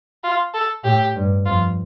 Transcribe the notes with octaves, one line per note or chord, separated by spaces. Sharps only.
F4
A4
A2 G4
G2
F2 F4